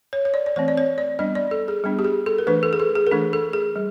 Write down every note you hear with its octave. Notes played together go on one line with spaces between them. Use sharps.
C#5
C#5
D5
D5
E3 A3 C4 C#5
D5
C#5
D5
G3 B3 D4 D#5
D5
A4
G#4
G3 B3 D4
G4
G#4
A4
A#4
E3 A3 D4 B4
A4
G#4
A4
G#4
A#4
E3 A3 D4 A4
A4
G#4
G3